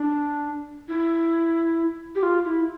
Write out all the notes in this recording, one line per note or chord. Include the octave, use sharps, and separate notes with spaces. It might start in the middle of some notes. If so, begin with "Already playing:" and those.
Already playing: D4
E4
G4
F4
E4